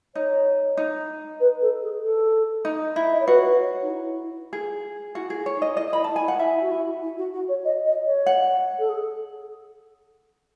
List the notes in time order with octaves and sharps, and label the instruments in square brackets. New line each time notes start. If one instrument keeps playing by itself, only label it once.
[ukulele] D#4 [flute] C#5
[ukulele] D#4
[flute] B4
A4
G#4
A4
[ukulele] D#4
E4
[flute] D#5
C#5
[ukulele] F#4 [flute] B4
[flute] C#5
D#4
E4
[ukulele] G#4
[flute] E4 [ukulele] F#4
[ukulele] G#4
[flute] E4
[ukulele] C#5
[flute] D#4
[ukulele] D#5
[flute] E4 [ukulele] D#5
[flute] E4 [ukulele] B5
[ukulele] A5
[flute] E4 [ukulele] G#5
[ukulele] F#5
[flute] E4 [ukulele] E5
[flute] F#4
E4
E4
F#4
F#4
C#5
D#5
D#5
C#5
[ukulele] F#5
[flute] A4
G#4